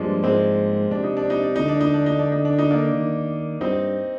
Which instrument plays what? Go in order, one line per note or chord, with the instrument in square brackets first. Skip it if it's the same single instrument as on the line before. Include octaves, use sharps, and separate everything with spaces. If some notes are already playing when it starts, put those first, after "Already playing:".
Already playing: [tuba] G2 [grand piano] F3 G#3 A#3 D4
[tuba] G#2 [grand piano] G#3 C4
[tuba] C3 [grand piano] D4
[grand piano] D#4
D4
D#4
D4
[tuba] D3 [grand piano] D#4
[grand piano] D4
D#4
D4
D#4
D4
D#4
D4
D#4
A#3 D4
[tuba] D#3
[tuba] G2 [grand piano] C4 D#4